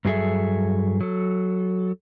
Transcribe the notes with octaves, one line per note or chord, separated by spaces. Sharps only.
G2 F#3 D#4 G#4 A4 E5
F#3 A4